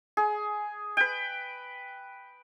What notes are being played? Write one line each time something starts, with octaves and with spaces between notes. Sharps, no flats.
G#4
B4 G5